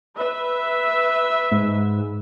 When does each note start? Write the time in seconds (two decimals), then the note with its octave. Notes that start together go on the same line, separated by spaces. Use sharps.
0.16 B4 E5
1.52 G#2